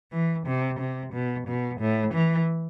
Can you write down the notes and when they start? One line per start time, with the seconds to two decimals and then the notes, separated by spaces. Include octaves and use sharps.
0.12 E3
0.47 C3
0.79 C3
1.13 B2
1.48 B2
1.80 A2
2.14 E3